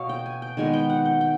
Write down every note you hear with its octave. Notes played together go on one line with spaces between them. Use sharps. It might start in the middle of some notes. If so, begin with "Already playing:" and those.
Already playing: B2 B3 C#5 F5
G5
G#5
G5
D#3 G#3 B3 G#5
G5
F#5
G5
G5